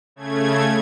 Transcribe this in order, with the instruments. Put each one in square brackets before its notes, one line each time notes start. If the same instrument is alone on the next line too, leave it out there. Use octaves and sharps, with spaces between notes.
[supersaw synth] C#3 A3 G#6